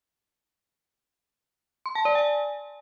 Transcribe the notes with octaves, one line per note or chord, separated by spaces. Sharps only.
C6
A5
D5
G#5